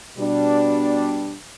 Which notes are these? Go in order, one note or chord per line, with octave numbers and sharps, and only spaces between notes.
B2 G3 D4